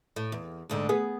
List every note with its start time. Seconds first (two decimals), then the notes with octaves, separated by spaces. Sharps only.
0.16 A2
0.32 E2
0.69 D2 G#2 D3
0.89 B3 G#4